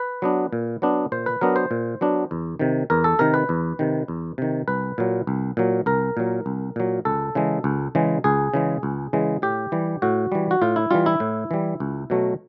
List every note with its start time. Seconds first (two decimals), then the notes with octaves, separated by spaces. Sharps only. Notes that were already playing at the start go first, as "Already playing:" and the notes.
Already playing: B4
0.22 F#3 B3 D4
0.53 A#2
0.82 F#3 B3 D4
1.12 A#2 C5
1.26 B4
1.41 F#3 B3 D4 A#4
1.56 C5
1.71 A#2
2.01 F#3 B3 D4
2.31 E2
2.59 C3 D#3
2.90 E2 A#4
3.04 A4
3.19 C3 D#3 A#4
3.34 B4
3.49 E2
3.79 C3 D#3
4.08 E2
4.38 C3 D#3
4.68 C2 B4
4.98 A#2 F#3
5.27 C2
5.57 A#2 F#3
5.86 C2 A#4
6.17 A#2 F#3
6.46 C2
6.76 A#2 F#3
7.05 C#2 A4
7.35 C#3 E3 G#3
7.64 C#2
7.95 C#3 E3 G#3
8.24 C#2 G#4
8.54 C#3 E3 G#3
8.83 C#2
9.13 C#3 E3 G#3
9.42 A2 G4
9.72 E3 G3
10.02 A2 F#4
10.32 E3 G3
10.51 F#4
10.62 A2 F4
10.76 E4
10.91 E3 G3 F4
11.06 E4
11.20 A2
11.51 E3 G3
11.80 C#2
12.10 B2 F#3 A3